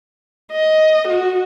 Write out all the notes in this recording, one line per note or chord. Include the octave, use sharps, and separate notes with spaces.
D#5
F#4